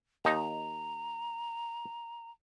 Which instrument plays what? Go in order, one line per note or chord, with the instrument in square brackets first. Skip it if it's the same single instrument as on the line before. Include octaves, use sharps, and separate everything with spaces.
[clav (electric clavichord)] D#2 D#4 [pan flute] A#5